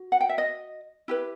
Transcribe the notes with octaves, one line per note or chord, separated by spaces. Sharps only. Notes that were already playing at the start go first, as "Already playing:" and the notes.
Already playing: F#4
F#5
G5
E5
D#5
E4 G4 B4